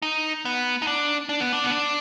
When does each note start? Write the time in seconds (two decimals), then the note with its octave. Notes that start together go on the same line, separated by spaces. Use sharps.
0.02 D#4
0.45 B3
0.82 D#4
0.87 D4
1.29 D4
1.40 B3
1.53 D4
1.64 B3
1.70 D4